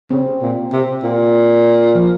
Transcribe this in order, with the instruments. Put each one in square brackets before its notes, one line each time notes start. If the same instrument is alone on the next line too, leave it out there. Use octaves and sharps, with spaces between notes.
[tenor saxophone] C#3 [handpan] C4
[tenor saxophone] A#2
C3
A#2
[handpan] F3